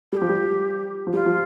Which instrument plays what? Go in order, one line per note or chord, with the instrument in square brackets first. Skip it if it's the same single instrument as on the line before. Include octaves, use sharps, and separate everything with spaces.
[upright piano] G3 [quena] A4
[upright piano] F3 [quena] G4
[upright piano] G3
F3
[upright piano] G3 [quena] F4
[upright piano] F3